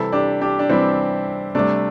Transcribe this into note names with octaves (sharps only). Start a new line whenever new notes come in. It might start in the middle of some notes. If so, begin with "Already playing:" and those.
Already playing: C3 E3 G3 E4 A4
D4 G4
D4 G4
D4
C3 E3 G3 C4 E4
C3 G3 A3 D4